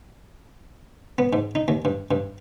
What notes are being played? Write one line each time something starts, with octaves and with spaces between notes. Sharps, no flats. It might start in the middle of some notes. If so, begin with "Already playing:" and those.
B3
G#2
D#4
D#2
G2
G2